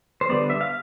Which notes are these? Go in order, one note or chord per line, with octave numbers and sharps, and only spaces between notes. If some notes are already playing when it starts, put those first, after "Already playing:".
C5
D3 G3 B3 D5
E5
F5